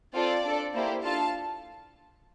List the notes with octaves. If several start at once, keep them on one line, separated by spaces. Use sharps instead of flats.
C4 F4 A4 D5
D4 A4
A#3 E4 G4 C5
D4 F4 A4 F5 A5